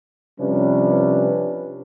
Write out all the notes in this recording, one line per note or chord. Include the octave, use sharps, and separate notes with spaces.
C3 F3 G3 C#4 D4 B4